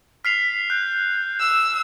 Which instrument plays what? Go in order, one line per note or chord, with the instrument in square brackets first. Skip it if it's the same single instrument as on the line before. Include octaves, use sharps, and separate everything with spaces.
[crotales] F6 C7 F7 [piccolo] B6
[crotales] F#6 [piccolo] G6
[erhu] E6